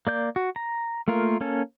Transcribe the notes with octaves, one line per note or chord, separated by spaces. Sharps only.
A#3 D5 G6
F#4
A#5
A3 A#3 F4 A#4
A#3 C#4 A4